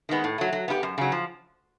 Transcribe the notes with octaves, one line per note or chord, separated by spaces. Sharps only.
D#3 G#3 B3
A2
F#3 A3
F#3
B3 E4 G4
F#2
C#3 F#3
F3